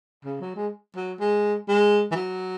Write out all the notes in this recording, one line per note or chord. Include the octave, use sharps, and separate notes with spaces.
C#3
F#3
G#3
F#3
G#3
G#3
E3
F#3